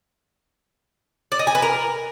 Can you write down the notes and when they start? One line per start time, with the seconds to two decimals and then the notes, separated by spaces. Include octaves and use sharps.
1.32 D5
1.39 D#5
1.47 G#5
1.55 B4
1.62 A#4